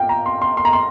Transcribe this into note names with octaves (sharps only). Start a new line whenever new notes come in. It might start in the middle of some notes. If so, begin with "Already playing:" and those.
Already playing: A#2 F5 G5
A#5
C6
C6
C6
A#5
C6